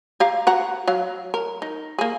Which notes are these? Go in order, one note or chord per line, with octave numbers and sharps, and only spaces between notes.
G4 F5 A#5
F#4 F#5 A#5
F#3 F5
A#4
D#4
A#3 G#4